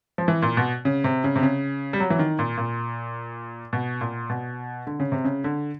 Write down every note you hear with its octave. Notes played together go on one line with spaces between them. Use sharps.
F3
E3
A#2
B2
C#3
C3
C#3
C3
C#3
G3
F#3
E3
D#3
A#2
A#2
B2
A#2
B2
D3
C#3
C3
C#3
D3